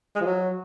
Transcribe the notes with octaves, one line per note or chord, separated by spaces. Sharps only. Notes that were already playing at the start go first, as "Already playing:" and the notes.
G#3
F3
F#3